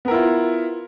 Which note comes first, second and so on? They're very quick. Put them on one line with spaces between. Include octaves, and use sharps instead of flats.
B3 A#4 E4 F4